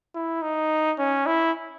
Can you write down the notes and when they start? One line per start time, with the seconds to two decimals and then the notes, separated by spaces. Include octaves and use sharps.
0.15 E4
0.42 D#4
0.98 C#4
1.26 E4